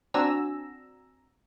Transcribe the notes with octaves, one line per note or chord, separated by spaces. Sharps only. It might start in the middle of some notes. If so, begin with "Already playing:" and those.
C4 D4 F#4 G#5 A#5 E6